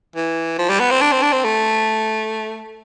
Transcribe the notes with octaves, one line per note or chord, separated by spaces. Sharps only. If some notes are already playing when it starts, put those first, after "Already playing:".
E3
F3
G3
B3
C4
D4
C4
D4
C4
A3